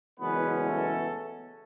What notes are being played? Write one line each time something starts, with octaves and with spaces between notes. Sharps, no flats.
F#1 E2 B2 G#3 B3 C#4 B4
A3 A4